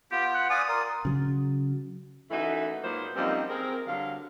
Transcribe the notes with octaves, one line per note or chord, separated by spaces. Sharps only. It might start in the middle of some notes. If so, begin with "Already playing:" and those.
B3 F4 G4
F#5
D5 F5 G#5 D#6
A#4 D5 C6
C#3 F#3
F#2 E3 A3 D#4 E4 F#4
G#2 F#3 A#3 B3 F4 C5
F#2 F3 G3 A#3 C4 D#4
C4 G#4 A#4
D3 F#3 G3 F5